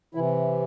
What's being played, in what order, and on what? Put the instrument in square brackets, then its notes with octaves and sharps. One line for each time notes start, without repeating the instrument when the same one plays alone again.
[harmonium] C3 E3 E4